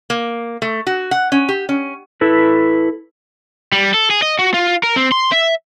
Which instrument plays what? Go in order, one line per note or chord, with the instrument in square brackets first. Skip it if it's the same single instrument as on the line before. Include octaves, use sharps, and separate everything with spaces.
[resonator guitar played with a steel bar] A#3
A3
F#4
F#5
C#4
G4
C#4
[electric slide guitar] E4 A4 B4
[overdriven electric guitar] G3
A4
G#4
D#5
F#4
F4
A#4
C4
C6
E5